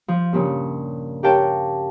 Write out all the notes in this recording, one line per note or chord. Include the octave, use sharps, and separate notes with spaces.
F3
G2 A#2 C#3
G4 A#4 C#5 F5 G5 A5